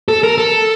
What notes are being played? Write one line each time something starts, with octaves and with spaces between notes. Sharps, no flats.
A4
A#4
A4